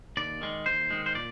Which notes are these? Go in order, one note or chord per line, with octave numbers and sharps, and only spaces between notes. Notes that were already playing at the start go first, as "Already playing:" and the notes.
D#2 D5
D#3 G#3
D#2 C5
D#3 G#3
C5
A#2 D5